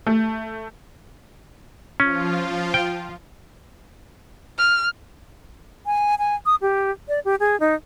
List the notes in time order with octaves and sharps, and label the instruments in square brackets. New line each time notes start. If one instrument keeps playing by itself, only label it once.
[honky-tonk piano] A3
[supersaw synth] F3 F4 [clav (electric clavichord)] C#4
[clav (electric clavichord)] G5
[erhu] F6
[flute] G#5
G#5
D#6
G4
D5
G4
G#4
D#4